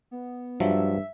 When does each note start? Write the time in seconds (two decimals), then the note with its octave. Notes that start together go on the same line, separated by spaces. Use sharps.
0.11 B3
0.60 G2 F3 F#3 E5